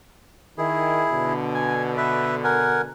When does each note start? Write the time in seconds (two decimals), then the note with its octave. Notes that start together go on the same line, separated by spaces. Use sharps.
0.58 D#3 E4 G#4
1.12 B2 D3
1.54 G#5
1.97 B4 E5
2.44 A#4 F#5 G#5